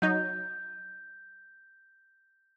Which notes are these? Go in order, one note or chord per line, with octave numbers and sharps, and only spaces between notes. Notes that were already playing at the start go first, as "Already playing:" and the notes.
F#3 D#4 G6